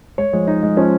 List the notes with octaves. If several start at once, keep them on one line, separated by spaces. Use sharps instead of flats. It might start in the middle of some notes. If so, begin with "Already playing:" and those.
G#3 C#5
F3 G#3
D#4
G#3
F3 C#4